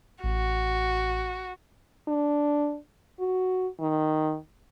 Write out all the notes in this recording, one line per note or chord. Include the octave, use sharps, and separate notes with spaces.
A1 F#4
D4
F#4
D#3